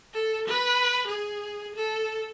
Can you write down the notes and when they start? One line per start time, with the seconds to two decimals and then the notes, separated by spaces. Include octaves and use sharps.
0.14 A4
0.47 B4
1.07 G#4
1.76 A4